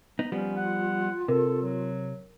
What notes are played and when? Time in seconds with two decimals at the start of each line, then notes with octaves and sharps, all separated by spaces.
0.19 B3 D#4
0.32 F3 G3 B3 C#4 F4
0.57 F#5
1.28 C3 A4 A#4
1.62 F#3